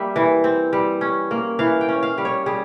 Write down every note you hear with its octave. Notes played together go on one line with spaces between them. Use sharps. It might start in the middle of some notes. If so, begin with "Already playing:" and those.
Already playing: G3 A#3 E5
E3
C4
G3
C#4
A#3
E3 F5
G5
C#4
F5
G3
C#5
G3 G#4